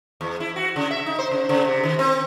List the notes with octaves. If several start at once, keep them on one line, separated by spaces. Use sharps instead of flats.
E2
E4
F#4
C#3
E5
D#4
C5
C#3
C#3
C3
D#3
C4